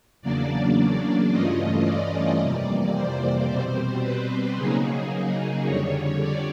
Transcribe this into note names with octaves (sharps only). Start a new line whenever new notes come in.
E2 C#3 F#3 A#3 D4 D5
G2 E3 A3 C#4 F4 D#5
D5
F2 C3 E3 G3 A#3
C5
B2 G3 C4 C5
B4
C#3 F#3 A#3 D#4 G#4
F2 D3 G3 C#5
D5